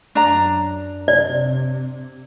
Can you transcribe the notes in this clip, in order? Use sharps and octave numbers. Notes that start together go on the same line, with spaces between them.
F#2 D4 A#5
C3 D5